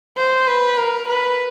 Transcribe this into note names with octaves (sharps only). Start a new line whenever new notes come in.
C5
B4
A#4
B4